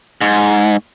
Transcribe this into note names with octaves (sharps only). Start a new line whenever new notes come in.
G#2